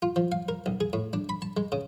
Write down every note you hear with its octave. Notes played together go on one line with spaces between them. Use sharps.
F4
F3
F5
A#4
B1
G#4
A2
D4
B5
A5
G#3
C#3